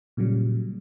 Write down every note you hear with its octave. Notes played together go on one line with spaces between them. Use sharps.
A#2 C#3 F#3 G3